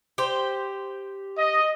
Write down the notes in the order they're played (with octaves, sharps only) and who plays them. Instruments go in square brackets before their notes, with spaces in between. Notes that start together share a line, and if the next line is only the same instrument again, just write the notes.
[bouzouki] G4 C5
[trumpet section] D#5